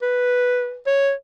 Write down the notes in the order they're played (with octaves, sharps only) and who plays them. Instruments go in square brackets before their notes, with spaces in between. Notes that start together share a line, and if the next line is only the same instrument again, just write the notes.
[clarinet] B4
C#5